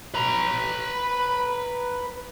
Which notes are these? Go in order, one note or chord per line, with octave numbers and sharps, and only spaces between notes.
B4 A#5